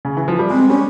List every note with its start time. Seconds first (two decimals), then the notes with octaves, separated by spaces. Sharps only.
0.05 C#3
0.17 E3
0.28 F3
0.39 G3
0.50 G#3 C4
0.68 G3 C#4